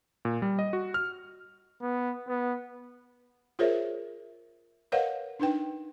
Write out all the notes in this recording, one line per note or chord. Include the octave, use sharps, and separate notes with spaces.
A#2
G3
D#5
F#4
F6
B3
B3
F4 G#4 A#4 C5 C#5 E5
A#4 B4 C#5 D#5 F5 F#5
D4 D#4 B4 G5